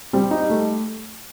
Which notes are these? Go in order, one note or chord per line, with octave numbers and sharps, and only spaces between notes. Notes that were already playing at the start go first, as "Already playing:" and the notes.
G3 C4
D#4
A3